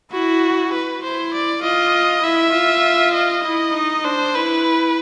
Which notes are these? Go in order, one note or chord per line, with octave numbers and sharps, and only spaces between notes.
E4 F#4
B4
E4 C5
D5
F4 D#5
E4 E5
F4
D#5
E4
D#4
D4 C5
E4 B4